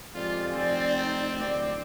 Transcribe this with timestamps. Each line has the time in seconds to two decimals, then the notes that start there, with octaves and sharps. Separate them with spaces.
0.15 F2 G#3 F4 G4 D5
0.54 F1 C4
0.85 D#4 G5
1.39 D1 D5